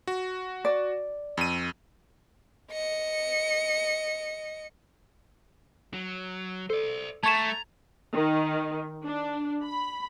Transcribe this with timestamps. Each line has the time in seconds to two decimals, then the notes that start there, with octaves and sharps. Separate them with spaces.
0.07 F#4
0.65 D5
1.37 F2 D#7
2.71 D#5 C#7
5.93 F#3
6.70 A4 C5 D5
7.23 A3 A5 A#5 C#6 G#6 A6 E7
8.13 D#3
9.04 D4
9.64 B5